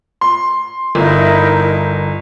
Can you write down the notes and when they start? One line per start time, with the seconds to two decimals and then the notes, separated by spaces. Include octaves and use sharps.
0.21 C6
0.95 G1 D#4 E4 A#4